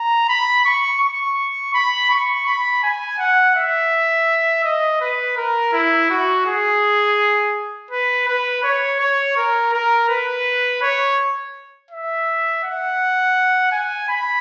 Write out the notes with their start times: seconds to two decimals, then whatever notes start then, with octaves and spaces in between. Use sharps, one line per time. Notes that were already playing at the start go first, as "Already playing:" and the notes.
Already playing: A#5
0.29 B5
0.65 C#6
1.01 C#6
1.74 B5
2.10 C#6
2.46 B5
2.83 G#5
3.19 F#5
3.56 E5
4.64 D#5
5.01 B4
5.37 A#4
5.73 E4
6.10 F#4
6.46 G#4
7.91 B4
8.28 B4
8.63 C#5
9.00 C#5
9.37 A#4
9.73 A#4
10.09 B4
10.82 C#5
11.91 E5
12.64 F#5
13.72 G#5
14.09 B5